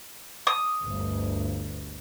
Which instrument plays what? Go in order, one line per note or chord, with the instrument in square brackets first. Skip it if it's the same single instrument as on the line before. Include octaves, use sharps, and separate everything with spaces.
[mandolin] D#6
[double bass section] G1 D2